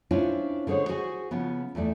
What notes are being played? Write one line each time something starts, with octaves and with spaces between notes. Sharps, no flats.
C#4 D4 E4 F4 C5 C#5
D3 G#3 G#4 C5 C#5
F#4 G#4 C5 G#5
C#3 F3 B3
E2 E3 A3 D5